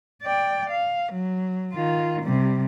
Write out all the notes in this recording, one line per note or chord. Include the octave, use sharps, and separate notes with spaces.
D5 G5
F5
F#3
D#3 F4
C3 G3